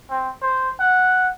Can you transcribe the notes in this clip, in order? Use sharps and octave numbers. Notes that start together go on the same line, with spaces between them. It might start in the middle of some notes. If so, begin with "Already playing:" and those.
C4
C5
F#5